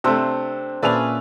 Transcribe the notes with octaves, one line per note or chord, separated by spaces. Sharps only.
C3 A3 C4 D4 C5 E6
A#2 C#4 G#4 B4 D5 E5 A5 F7